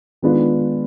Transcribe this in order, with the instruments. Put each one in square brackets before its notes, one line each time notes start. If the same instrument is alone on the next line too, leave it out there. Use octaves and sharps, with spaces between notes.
[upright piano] D#3 G#3 B3 D4 F4